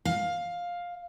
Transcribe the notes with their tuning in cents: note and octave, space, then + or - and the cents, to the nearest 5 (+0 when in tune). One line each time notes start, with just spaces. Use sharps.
F5 +10